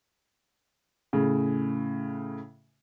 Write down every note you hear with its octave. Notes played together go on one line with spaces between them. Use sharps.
A2 C#3